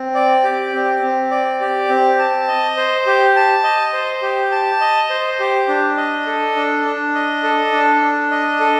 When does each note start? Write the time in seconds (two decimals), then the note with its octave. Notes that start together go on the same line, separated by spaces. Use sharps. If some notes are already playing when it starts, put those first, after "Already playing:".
Already playing: C4
0.15 D5
0.44 G4
0.73 C4
1.02 C4
1.31 D5
1.60 G4
1.89 C4
2.19 A5
2.48 D#5
2.77 C5
3.07 G4
3.36 A5
3.64 D#5
3.93 C5
4.22 G4
4.52 A5
4.81 D#5
5.10 C5
5.40 G4
5.68 D4
5.97 D#5
6.27 A4
6.56 D4
6.85 D4
7.15 D#5
7.43 A4
7.72 D4
8.01 D4
8.31 D#5
8.60 A4